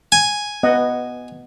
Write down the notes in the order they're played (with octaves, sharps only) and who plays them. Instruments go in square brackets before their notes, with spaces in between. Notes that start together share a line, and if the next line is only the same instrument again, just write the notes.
[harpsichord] G#5
[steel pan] B3 D#5 F#5